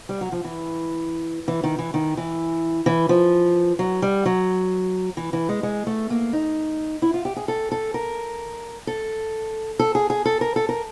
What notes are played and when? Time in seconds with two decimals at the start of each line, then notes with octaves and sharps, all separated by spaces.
0.09 G3
0.21 F#3
0.32 F3
0.44 E3
1.48 E3
1.64 D#3
1.79 E3
1.94 D#3
2.17 E3
2.86 E3
3.09 F3
3.79 F#3
4.02 G3
4.26 F#3
5.17 E3
5.33 E3
5.49 G#3
5.63 G#3
5.87 A3
6.10 A#3
6.33 D#4
7.02 E4
7.14 F4
7.25 G4
7.36 G#4
7.48 A4
7.72 A4
7.94 A#4
8.87 A4
9.79 A4
9.95 G#4
10.10 G#4
10.26 A4
10.41 A#4
10.56 A4
10.69 A#4